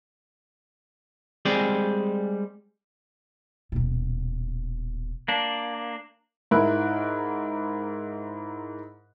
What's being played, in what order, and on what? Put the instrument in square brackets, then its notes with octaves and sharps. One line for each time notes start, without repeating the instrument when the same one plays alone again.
[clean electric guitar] G3 G#3 C4 G#4 D5
[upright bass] D#1 B2
[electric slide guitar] A#3 D4
[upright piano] G#2 E4 A#4 F#6